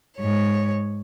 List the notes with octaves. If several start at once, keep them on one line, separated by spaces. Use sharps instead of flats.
G#2 C#5